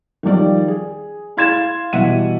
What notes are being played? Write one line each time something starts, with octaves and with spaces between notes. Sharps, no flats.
D#3 F3 G3 D5
G#4
E4 F5 C6 G#6 A6 E7
B2 E3 G3 E5 F#5 D#7